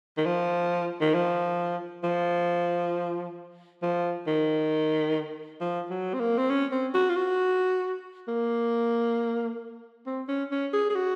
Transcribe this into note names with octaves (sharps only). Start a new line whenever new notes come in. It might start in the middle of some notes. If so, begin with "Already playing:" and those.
D#3
F3
D#3
F3
F3
F3
D#3
F3
F#3
C4
A#3
C4
C#4
C4
F#4
F4
F#4
A#3
C4
C#4
C#4
G#4
G#4
F#4